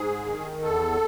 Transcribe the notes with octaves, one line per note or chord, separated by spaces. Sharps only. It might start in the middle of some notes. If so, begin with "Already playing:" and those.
Already playing: G#2 G#4
D#3
E2 A4